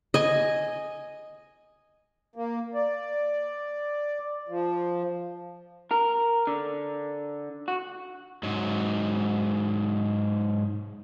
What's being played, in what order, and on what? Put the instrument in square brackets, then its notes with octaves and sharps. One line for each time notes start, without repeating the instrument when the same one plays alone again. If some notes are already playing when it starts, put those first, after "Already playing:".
[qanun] D#5 G#5
[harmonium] A#3
D5
F3
[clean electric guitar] A#4
D3
F#4
[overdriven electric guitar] G#2 F#3